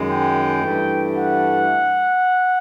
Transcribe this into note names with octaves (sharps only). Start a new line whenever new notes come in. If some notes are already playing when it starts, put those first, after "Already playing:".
Already playing: F#2 D#3 G#3
G5
G2 E3 A3
F#5